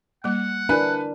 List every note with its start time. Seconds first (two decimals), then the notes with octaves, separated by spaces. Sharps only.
0.24 G3 A#3 F#5
0.69 D4 E4 A#4 B4 G#5